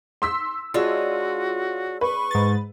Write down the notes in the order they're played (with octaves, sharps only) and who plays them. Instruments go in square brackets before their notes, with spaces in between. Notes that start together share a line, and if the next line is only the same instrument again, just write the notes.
[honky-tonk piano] C6 E6 B6
[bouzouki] G#3 D4 C#5 [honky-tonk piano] F4 [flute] F#4
[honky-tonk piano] B4 [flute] C#6
[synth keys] G#2 A6